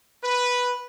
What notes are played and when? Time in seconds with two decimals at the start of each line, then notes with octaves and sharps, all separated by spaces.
0.22 B4